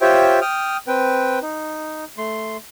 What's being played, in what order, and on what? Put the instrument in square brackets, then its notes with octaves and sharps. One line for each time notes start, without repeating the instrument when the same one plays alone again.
[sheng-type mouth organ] F4 G4 C5 C#5 E5 G5
G5 D#6 F6
C4 B4 G5
D#4
A3 C6